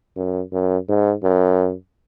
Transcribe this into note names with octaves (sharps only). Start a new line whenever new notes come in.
F#2
F#2
G#2
F#2